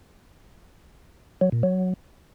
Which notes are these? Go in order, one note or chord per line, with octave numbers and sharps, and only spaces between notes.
F#3
A#2
F#3